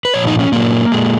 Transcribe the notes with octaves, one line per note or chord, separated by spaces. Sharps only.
B4
A#2 F3 C#5
D#4
C#4
A#2 F#3 A#3
A#2 G#3